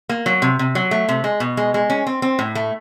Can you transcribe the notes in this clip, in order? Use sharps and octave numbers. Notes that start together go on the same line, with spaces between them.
A#3
F#3
C3
C3
F#3
A3
C3
G#3
B2
G#3
G#3
C#4
C4
C4
A2
A3